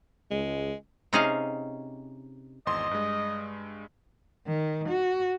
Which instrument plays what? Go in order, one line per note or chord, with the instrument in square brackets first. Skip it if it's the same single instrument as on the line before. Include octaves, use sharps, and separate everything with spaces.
[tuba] C#2 [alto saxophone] G#3
[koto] C3 C#4 D#4 G#4 D#5 F5
[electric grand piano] G#1 E2 C6 [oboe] D#5
[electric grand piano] G2 G#3
[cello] D#3
F#4